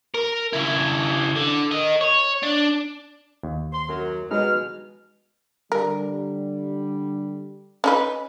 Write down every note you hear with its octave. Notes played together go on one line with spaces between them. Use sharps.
A#4
C#3 E4
D3
A#4 D#5
C#5
D4
D#2
C6
F#2 F#3 A#4
B2 G#3 D#4 G#4 B4 F6
D3 G3 A#4
C#4 D#4 B4